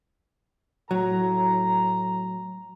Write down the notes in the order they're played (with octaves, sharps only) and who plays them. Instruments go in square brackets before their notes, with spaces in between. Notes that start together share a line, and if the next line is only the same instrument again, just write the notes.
[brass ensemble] A2 A#5 [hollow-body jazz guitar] F#3